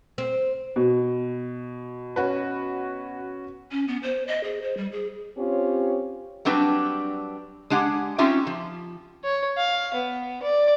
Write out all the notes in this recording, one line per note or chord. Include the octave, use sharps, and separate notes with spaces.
C4
B2
C#4 F#4 B4
C#4
B3
C5
D#5
G#4
C5
G3
G#4
C4 C#4 F4 G4 C#5
F#3 G3 C4 D4 B4
G#3 D4 G4 F#5 G#5
C4 C#4 D#4 F4 G4 E5
F3
C#5
F5
B3
D5